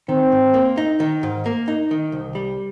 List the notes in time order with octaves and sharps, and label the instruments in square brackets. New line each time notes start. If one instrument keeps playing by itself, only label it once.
[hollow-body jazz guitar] D#3 [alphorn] C4
[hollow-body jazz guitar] G#2
A#3
D#4
D#3
G#2
A#3
D#4
D#3
C2
G3